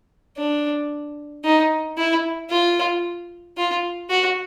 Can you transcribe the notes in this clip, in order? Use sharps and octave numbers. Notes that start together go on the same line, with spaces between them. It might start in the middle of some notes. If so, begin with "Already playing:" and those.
D4
D#4
E4
F4
F4
F#4